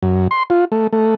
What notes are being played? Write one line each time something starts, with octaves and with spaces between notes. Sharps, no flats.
F#2
C6
F4
A3
A3